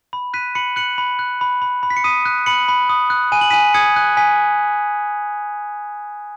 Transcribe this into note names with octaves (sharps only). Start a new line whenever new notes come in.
B5
F#6 B6 D#7
B5 C#7 F#7
F#6 C#7 F#7
B5
F#6
B5
B5
B5
B6
C#7
D#6 B6 D#7
F#6
B5 C#7 F#7
B5
D#6
F#6
G#5 D#7
F#7
G#5 B6 D#7
D#6 G#6 C#7
F#6
G#5 B6